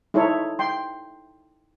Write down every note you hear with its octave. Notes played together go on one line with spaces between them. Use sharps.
D#4 E4 A4 C5 C#5
G5 C6